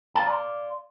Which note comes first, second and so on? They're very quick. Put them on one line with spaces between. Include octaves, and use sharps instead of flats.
A5 F5 D5 A#5 C6